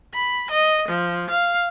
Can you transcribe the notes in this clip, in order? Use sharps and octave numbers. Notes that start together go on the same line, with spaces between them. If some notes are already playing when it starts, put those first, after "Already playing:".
B5
D#5
F3
F5